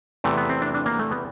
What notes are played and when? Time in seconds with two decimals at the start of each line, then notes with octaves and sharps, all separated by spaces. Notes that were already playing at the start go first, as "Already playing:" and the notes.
0.24 E2 C3 E3 A3
0.38 B3
0.50 C4
0.62 D4
0.74 D4
0.86 A#3
0.99 A3
1.11 B3